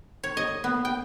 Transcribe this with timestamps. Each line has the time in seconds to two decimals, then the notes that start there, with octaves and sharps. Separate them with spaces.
0.23 C#5
0.37 D#5
0.64 B3
0.85 G5